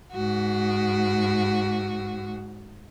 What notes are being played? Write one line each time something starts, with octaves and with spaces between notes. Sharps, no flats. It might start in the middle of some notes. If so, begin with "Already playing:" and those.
G#2 F#4